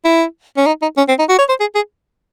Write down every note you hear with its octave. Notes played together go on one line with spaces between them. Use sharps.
E4
C#4
D#4
D#4
C#4
C4
D#4
F#4
C#5
C5
G#4
G#4